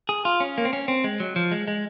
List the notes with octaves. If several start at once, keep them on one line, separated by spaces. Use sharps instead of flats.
G#4
F4
C#4
A#3
C4
C#4
C4
G#3
F#3
F3
G#3
G#3